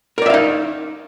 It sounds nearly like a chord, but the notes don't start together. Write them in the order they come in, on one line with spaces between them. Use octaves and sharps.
A#4 D5 E5 F5 D#4